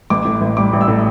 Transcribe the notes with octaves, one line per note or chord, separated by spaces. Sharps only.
A1 D6
A2
A1
G3 D6
A1
E6
A2